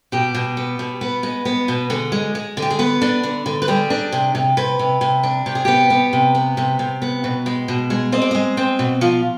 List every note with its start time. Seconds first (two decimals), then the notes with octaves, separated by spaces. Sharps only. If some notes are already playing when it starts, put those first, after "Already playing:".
0.12 B2 G4
0.34 B2
0.57 B3
0.79 B2
1.01 B3 B4
1.23 G#3
1.45 B3
1.68 B2
1.90 D3 G#4
2.12 G#3
2.35 G#3
2.57 D3
2.62 G4
2.70 G#4
2.79 B3 B4
3.02 D4
3.23 D3
3.46 D3
3.62 B4
3.68 G3 G#4
3.90 D4
4.12 C3
4.35 C3
4.57 C3 B4
4.79 C3
5.01 C3
5.23 D4
5.46 C3 G4
5.55 G#4
5.65 B3 G4
5.90 B3
6.13 C3
6.35 B3
6.57 C3
6.79 C3
7.02 B3
7.24 B2
7.46 G#3
7.68 B2
7.90 G#3
8.12 C4 D#5
8.22 D5
8.31 G#3 D#5
8.57 C4
8.79 B2
9.01 F3 F4